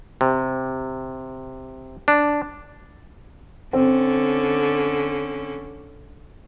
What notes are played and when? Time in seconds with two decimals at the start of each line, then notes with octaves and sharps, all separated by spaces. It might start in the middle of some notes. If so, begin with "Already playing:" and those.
0.21 C3
2.08 D4
3.73 D3 C4 C#4